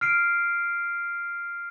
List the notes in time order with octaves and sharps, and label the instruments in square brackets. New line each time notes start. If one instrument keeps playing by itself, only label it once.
[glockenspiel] F6 C7 D7